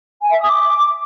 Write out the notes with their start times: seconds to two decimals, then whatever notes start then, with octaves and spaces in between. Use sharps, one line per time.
0.20 G#5
0.30 E5
0.39 D#6
0.48 D6